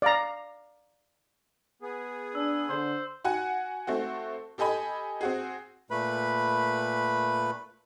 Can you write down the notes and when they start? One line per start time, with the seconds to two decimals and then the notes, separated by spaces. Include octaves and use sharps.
0.02 D5 F5 A#5
1.82 B3 G#4
2.35 D4 E6
2.69 D3 C5
3.25 F#4 F#5 G#5
3.87 A3 C4 F#4
4.58 G4 A4 D#5 G#5 B5
5.21 C4 F#4 G#4
5.90 A#2 A3 B4 B5